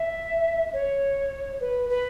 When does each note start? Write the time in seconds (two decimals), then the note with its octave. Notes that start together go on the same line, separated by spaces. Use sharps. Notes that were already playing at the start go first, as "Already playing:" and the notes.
Already playing: E5
0.73 C#5
1.61 B4
1.90 B4